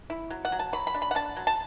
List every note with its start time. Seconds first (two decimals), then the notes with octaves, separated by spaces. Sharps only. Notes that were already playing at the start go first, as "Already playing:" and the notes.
0.10 E4
0.30 F#3
0.45 F#5
0.52 F#3
0.59 A5
0.73 F#3 B5
0.87 B5
0.94 D4
1.02 B5
1.11 F#5
1.15 D4 A5
1.37 F#3
1.47 A5